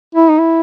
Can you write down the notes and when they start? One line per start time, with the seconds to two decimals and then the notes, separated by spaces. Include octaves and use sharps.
0.15 E4
0.29 D#4
0.39 E4